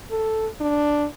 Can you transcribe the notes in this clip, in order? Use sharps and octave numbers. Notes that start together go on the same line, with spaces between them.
A4
D4